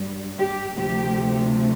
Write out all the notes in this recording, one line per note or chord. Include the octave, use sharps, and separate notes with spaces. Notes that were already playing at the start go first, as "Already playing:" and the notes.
Already playing: G2 G3
G4
D2 C3 F3 A3 G4